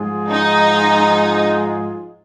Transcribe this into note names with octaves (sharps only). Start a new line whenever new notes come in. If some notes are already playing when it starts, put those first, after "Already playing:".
Already playing: G#2 F3 G#3 F4 G#4
D#4